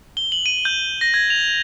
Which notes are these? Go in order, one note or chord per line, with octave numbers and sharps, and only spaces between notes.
G7
F#7
D#7
G6
A#6
G#6
F7